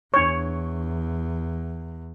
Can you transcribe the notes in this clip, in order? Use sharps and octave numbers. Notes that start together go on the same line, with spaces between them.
E2 D4 C#5 C#6